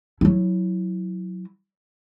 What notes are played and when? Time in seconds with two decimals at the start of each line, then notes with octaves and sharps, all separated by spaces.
0.21 F#3 E4